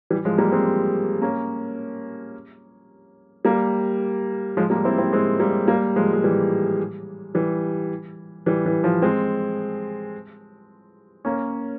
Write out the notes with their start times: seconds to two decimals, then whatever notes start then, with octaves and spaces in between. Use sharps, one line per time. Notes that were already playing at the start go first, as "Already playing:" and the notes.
0.10 E3 G3
0.25 F3 G#3
0.38 G3 A#3
0.52 G#3 C4
1.22 A#3 C#4
3.45 G3 A#3
4.57 F3 G#3
4.70 G3 A#3
4.84 C4 E4
4.98 C4 E4
5.13 G#3 C4
5.40 G3 A#3
5.68 G3 A#3
5.96 F3 G#3
6.13 G#3
6.24 E3 G3
7.35 E3 G3
8.46 E3 G3
8.66 E3
8.84 F3
9.02 G#3 C4
11.25 A#3 C#4